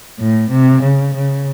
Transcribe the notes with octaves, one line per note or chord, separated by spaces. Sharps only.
A2
C3
C#3
C#3